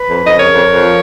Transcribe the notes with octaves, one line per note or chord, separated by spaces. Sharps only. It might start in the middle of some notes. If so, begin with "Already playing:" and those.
Already playing: B4
F2
F2 D#5
C#3 A#4 C#5
F2
F2
F3